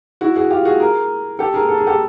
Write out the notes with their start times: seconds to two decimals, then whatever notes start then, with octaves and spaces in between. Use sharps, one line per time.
0.21 E4 F#4
0.36 F#4 G#4
0.51 F4 G4
0.65 F#4 G#4
0.80 G#4 A#4
1.39 G4 A4
1.54 G#4 A#4
1.69 A4
1.78 G#4
1.87 G4 A4